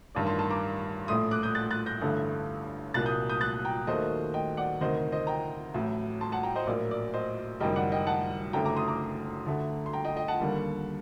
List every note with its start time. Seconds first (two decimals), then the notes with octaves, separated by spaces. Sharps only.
0.15 A1 G2 D#3 D5
0.26 A5 C6
0.39 A5 C6
0.50 A#5 D6
1.08 A#1 A2 A3 C6 D#6
1.31 D6 F#6
1.43 D#6 G6
1.55 F#6 A6
1.71 F#6 A6
1.86 G6 A#6
2.02 A1 G2 D3 A3
2.94 C2 A#2 F#3 A#3 F#6 A6
3.06 D#6 G6
3.29 D#6 G6
3.41 F#6 A6
3.65 G5 A#5
3.87 D#2 D#3 F#3 A3 C5 D#5
4.34 D#5 G5
4.57 D5 F#5
4.81 D2 C3 D#3 C5 D#5
4.96 C5
5.12 C5 D#5
5.27 G5 A#5
5.74 A1 A2 F#3
6.21 A5 C6
6.32 F#5 A5
6.43 G5 A#5
6.55 C5 D#5
6.67 A#1 A2 F#3 A#3 D5
6.91 D5
7.14 C5 D#5
7.60 F#1 F#2 D#3 G3 D#5 G5
7.76 D5 F#5
7.92 D#5 G5
8.07 F#5 A5
8.53 F#1 F#2 D3 A3 G5 A#5
8.65 A#5 D6
8.76 C6 D#6
8.88 A#5 D6
9.46 D2 D3 A3
9.86 C6
9.93 G5 A#5
10.05 D#5 G5
10.16 D#5 G5
10.28 F#5 A5
10.40 D#2 D3 G3 A#3